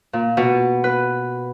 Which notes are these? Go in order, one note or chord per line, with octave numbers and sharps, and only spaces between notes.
A#2
B2
B4